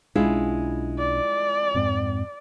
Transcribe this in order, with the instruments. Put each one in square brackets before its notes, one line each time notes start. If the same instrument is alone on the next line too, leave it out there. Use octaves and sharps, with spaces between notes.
[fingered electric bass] B1 C#4 D4 [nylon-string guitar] G#3 E4 F4
[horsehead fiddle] D5
[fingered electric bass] F2 G#2 C4